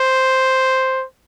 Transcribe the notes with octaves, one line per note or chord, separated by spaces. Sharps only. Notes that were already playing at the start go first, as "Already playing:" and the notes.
Already playing: C5